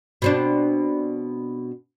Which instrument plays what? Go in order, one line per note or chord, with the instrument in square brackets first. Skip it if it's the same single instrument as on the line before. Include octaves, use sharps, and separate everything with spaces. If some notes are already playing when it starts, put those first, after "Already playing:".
[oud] B2 C4 D4